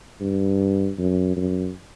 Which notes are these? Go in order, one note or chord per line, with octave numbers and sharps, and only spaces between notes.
G2
F#2
F#2